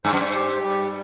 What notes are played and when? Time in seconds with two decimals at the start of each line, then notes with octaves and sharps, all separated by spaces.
0.05 G2 C5
0.13 F#2
0.21 G2
0.34 G4
0.63 G3